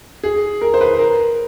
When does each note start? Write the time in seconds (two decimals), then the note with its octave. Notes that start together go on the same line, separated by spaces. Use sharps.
0.24 G#4
0.61 A#4
0.74 C5
0.81 B4
0.99 A#4